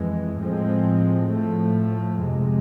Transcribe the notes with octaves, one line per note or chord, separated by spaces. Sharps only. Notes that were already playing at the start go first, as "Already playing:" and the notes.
Already playing: F2 E3 G#3
A2 F3 G#3 C4
A2 F3 A3
F2 C3 G#3